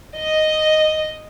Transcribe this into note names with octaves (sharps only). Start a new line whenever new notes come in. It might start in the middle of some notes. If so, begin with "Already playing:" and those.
D#5